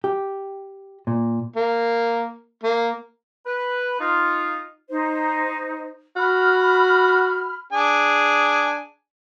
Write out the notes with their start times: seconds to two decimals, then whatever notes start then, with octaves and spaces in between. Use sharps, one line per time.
0.04 G4
1.07 A#2
1.56 A#3
2.63 A#3
3.46 B4
4.00 D#4 F4
4.89 D#4 C5
6.16 F#4 B5 F6
7.72 D4 G#4 G#5